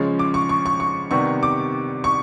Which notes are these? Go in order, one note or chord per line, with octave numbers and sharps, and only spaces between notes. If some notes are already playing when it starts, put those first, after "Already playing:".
Already playing: C#3 F3 G#3 C#4
D6
C#6
C#6
C#6
C#6
C3 D#3 G3 B3 C#6
D6
C#6